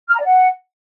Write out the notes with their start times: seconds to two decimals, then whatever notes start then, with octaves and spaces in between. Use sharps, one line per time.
0.08 F6
0.14 A#5
0.19 D5
0.25 F#5